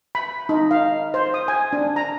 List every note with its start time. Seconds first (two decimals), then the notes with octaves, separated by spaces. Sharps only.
0.15 B5
0.49 D#4
0.71 F5
1.14 C5
1.34 D#6
1.48 G#5
1.73 D4
1.96 A#5